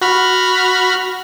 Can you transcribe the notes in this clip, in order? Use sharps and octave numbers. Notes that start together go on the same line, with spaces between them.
F#4 B5 F6